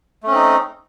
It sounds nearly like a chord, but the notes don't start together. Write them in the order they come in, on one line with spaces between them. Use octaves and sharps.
A3 C#4 C4 D#4